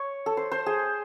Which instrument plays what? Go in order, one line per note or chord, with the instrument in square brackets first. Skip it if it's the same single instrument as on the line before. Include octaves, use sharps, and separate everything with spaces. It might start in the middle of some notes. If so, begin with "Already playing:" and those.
Already playing: [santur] C#5
A4
C5
C5
G#4